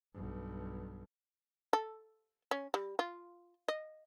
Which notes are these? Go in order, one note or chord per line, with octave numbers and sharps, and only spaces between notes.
B1 G2
A4
C#4
G3
F4
D#5